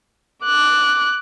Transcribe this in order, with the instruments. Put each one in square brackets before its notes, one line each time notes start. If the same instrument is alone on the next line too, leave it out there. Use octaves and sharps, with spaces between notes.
[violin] D6 F#6